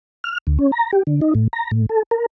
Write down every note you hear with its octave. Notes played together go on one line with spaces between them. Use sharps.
F6
D2
C#4
A#5
G4
D3
D#4
A2
A#5
A2
A4
A#4